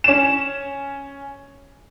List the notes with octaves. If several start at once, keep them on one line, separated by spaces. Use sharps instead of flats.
C#4 E7